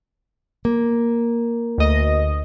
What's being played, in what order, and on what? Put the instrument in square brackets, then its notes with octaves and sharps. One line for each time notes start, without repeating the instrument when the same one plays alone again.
[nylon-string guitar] A#3
[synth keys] D2 D#5